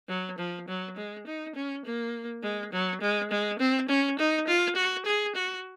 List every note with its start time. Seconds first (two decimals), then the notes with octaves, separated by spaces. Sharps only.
0.09 F#3
0.38 F3
0.68 F#3
0.96 G#3
1.27 D#4
1.55 C#4
1.85 A#3
2.43 G#3
2.73 F#3
3.01 G#3
3.31 G#3
3.59 C4
3.89 C#4
4.19 D#4
4.47 F4
4.76 F#4
5.05 G#4
5.35 F#4